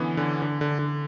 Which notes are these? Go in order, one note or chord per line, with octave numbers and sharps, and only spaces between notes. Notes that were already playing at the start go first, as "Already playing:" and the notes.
Already playing: D3 E3 B3 C#4
D3
D3
D3
D3